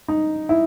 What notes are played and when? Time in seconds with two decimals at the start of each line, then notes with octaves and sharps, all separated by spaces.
0.08 D#4
0.49 E4